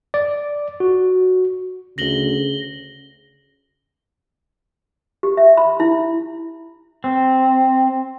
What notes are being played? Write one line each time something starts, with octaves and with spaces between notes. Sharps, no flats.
D5
F#4
D2 C#3 A#6 F#7 G7
G4
E5
B5
E4
C4